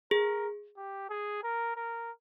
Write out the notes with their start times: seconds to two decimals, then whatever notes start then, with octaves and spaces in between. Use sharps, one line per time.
0.11 G#4 A#4
0.77 G4
1.10 G#4
1.44 A#4
1.76 A#4